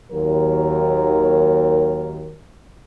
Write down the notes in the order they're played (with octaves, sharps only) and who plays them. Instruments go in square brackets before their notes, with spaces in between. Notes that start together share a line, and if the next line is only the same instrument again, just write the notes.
[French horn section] D#2 F#3 A#4